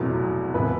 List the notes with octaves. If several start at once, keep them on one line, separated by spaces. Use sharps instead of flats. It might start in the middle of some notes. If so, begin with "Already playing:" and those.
Already playing: F1 E2 B2 F#3
E1 C3 B4